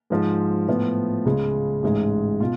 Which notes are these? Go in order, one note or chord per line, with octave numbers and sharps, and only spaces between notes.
G#2 F3 G#3
A2 F3 B3
C#2 C#3 G#3
A1 G#2 G#3
B2 F4